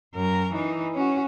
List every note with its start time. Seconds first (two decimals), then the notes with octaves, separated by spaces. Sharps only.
0.14 F#2 A#4
0.53 E3 D#4
0.94 C#4 F#4